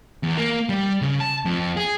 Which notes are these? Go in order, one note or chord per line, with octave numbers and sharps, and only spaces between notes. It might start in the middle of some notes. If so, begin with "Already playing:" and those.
E2
A#3
G3
C#3
A5
F2
G#4